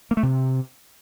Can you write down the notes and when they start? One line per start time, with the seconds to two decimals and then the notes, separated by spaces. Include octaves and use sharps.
0.11 A#3
0.17 A3
0.23 C3